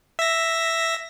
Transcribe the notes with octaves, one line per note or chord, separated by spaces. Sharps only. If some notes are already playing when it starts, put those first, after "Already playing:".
E5 A#6